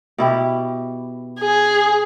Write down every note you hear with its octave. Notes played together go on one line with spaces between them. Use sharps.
B2 E4 G4
G#4